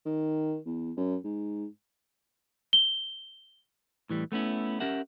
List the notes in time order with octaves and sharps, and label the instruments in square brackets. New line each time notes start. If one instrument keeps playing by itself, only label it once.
[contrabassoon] D#3
E2
F#2
G#2
[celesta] G7
[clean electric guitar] A2 E3 G3
A3 B3 C#4 E4
C#4 G4 A#4 E5 F#5